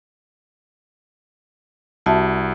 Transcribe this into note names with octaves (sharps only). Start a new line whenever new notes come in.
C2 F#4 E5 A5